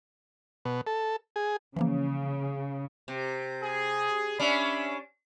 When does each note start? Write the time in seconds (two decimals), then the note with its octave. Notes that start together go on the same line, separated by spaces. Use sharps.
0.65 B2
0.87 A4
1.36 G#4
1.76 C#3 E3 F3 A#3
3.08 C3
3.63 G#4
4.39 C#4 D4 E5 B5